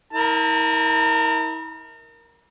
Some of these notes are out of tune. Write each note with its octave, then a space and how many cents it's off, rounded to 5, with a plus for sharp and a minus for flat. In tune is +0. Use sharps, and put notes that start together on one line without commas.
E4 -45 A#4 +0 A#5 -45